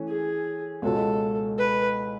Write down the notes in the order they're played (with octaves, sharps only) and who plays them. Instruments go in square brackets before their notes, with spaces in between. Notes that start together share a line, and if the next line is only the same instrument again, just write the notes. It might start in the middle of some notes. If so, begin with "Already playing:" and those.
Already playing: [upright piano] E3 A3 C#4
[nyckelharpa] G#4
[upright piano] C#2 B2 G#3 C#4 F#4 [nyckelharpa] A4
[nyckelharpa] B4